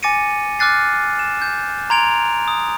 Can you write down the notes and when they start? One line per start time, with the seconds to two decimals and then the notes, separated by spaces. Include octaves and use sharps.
0.03 G#5 D6 A6 A#6 C#7 D#7
0.59 D6 F6 F#6 A6 C7
1.19 E7
1.42 G6
1.90 A#5 C6 G#6 D7 F7
2.48 D#6